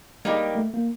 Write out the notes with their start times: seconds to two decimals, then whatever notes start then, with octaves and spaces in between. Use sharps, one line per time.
0.25 G3 G#3 A#3 D#4 G4
0.55 A3
0.74 A#3